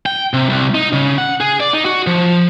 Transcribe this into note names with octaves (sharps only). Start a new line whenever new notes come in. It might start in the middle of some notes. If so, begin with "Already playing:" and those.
G5
C3
C2
D#4
C#3
F#5
G#4
D5
D#4
F#4
F3